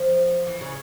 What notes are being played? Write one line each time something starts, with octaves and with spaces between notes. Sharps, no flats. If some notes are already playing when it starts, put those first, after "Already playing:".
Already playing: F3
E3
C#3